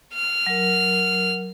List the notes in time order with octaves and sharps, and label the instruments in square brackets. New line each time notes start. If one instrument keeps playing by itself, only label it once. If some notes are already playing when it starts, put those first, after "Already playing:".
[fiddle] F6
[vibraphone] F#3 A#4